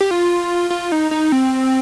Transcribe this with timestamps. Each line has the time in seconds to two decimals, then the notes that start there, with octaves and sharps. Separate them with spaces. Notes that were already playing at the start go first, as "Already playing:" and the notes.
0.01 G4
0.11 F4
0.70 F4
0.92 D#4
1.11 D#4
1.32 C4